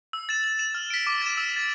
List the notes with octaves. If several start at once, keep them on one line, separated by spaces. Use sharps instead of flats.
E6
A6 E7
A6
E7
F6
B6 D7
D6
A6 E7
E6
A6 E7